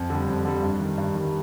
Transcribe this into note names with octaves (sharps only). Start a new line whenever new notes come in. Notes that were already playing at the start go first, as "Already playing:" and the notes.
Already playing: F2
D3 G3
F2
D3 G3
G2
D#3 G3
G2
D#3 G3